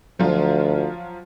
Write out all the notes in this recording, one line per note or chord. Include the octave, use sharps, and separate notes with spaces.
D2 F3 F#3 F4